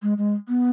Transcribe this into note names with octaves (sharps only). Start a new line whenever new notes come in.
G#3
G#3
B3